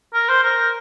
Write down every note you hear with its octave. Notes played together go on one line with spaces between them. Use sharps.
A#4
C5
A#4